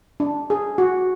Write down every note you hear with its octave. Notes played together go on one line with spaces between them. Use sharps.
D4
G#4
F#4